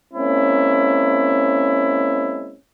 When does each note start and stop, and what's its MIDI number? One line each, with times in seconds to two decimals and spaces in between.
0.14 2.55 56
0.14 2.55 58
0.14 2.55 60
0.14 2.55 61
0.14 2.55 64